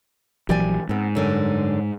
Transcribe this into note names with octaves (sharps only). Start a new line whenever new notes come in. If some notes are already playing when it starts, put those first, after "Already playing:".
A#1 E3 F#3 G4 D5 G#5
G#2 B3 C4
F#2 D3 G3